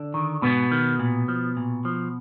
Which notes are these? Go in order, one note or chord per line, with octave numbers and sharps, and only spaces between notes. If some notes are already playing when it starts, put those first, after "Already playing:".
Already playing: D3 D4
D#3
G#2 B2 B3
D#3
A#2
F3
A#2
F3